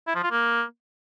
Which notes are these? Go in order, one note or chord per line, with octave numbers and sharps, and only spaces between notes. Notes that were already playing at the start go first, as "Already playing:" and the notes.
E4
F3
F4
A#3